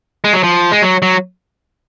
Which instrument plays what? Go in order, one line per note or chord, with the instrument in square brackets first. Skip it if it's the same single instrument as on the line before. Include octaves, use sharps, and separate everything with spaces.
[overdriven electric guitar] G#3
F#3
F3
G#3
F#3
F#3